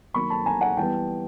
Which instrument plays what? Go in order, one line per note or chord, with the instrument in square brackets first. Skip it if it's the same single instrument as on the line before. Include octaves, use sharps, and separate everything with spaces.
[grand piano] D#3 F#3 A#3 B5 C#6
A5 B5
G#5 A#5
F#5 G#5
E3 G3 B3 G5 A5